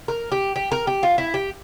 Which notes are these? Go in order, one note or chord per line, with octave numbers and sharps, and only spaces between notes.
A#4
G4
G4
A#4
G4
F4
E4
G4